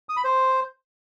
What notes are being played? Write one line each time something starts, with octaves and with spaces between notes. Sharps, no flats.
D#6
B5
C5